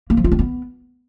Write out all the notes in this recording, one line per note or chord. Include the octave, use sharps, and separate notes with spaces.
A#3
F3
F4
C4
B3